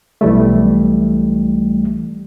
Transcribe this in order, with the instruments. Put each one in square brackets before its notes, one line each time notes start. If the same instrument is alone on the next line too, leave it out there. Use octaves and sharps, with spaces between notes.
[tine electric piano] B1 E3 G3 A3